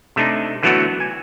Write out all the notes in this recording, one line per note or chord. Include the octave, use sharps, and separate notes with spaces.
C3 A3 D4 D#4
D3 E3 F#3 A3 B3 F#4
G#5